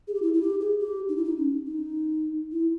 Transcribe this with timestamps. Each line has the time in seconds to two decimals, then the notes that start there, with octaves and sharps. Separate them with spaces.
0.08 G#4
0.14 G4
0.22 E4
0.34 E4
0.42 G4
0.61 G#4
0.80 G4
1.08 D#4
1.17 E4
1.25 D#4
1.38 C#4
1.66 D#4
2.52 E4